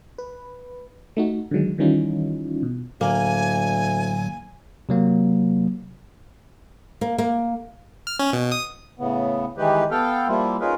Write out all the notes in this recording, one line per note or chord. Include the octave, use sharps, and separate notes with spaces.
B4
A3 D#4 F#4
D3 D#3 F#3 G#3
D#3 E3 G3 C#4 D#4 F4
B2
D2 A2 D3 F#3 A#3 G#5
C3 F#3 A#3
A#3
A#3
F6
C#4
B2
D#6
A2 C#3 B3
D#3 E3 G3 G#3 G4 B4
B3 A4 F5 G5
F3 G3 A#3 E4 F4
C#4 D#4 F4 G#4 A#4 B4